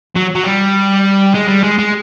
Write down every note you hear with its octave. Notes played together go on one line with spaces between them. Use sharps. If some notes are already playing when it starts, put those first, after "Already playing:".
F#3
F#3
G3
G#3
G3
G#3
G#3